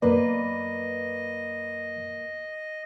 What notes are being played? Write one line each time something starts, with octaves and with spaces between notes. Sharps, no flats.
F#2 A#3 B4 D5 D#5